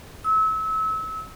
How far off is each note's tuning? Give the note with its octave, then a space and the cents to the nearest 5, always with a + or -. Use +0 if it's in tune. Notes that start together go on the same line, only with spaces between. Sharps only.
E6 -30